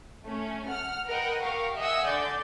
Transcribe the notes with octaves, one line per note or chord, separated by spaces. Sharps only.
A3 C#4
F#5 F6
A#4 B4 D#5 F#5 G5
G4 A#4 F5 C#6
D#5 E5 F#5 G#5 E6
D3 D5 G6